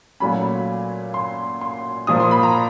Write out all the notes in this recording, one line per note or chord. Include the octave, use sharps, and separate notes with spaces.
A#2 F#3 A3 C#4 B5
C6
C6
A#2 F3 A#3 D#6
C6
B5
A#5